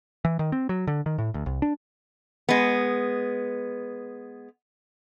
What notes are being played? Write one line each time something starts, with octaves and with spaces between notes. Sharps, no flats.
E3
D#3
C4
F#3
D3
D#3
A2
D2
C2
D4
G#3 B3